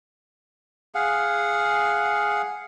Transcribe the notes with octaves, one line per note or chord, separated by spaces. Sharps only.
G#4 F5 F#5